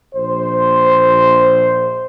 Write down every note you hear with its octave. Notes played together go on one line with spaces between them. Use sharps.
A#1 C5